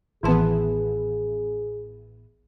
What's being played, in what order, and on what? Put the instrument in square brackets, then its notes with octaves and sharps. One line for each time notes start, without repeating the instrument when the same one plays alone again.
[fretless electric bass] A1 [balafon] D#3 E3 A5 [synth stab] B3 E4 [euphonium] G#4